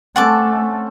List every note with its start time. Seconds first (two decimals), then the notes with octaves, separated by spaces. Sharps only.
0.16 A3 C4 C#4 A4 F#5 A5 D6